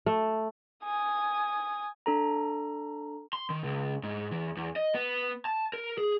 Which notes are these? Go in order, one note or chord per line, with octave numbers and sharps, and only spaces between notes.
A3
G#5 D#6
D4 A4 A#5
C6
D#3
C#2
G#2
E2
E2
D#5
B3
A5
A#4
G#4